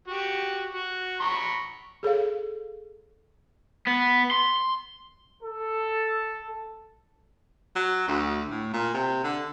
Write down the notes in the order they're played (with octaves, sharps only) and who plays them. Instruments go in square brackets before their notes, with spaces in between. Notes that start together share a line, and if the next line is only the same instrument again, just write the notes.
[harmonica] F#4 G4
F#4
A#5 B5 C#6
[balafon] G#4 A4 C#5 F5
[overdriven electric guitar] B3
C6
[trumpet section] A4
[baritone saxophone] F#3
D2
A2
A#2
C3
D3